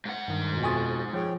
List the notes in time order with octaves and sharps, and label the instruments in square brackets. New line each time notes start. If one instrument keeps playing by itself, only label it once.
[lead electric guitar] G#2 F#5
[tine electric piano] G2 D#3
[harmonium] F2 B2
[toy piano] F#4 E5 G#5 [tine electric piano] C#6 D#6 A6
[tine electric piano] F3 [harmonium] G#4 C#5 G5